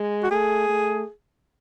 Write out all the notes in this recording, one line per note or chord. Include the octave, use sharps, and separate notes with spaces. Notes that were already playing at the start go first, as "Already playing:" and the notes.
Already playing: G#3
F#4
A3 G#4
A3